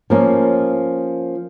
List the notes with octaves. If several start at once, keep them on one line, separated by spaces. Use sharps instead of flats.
F3 A#3 C#4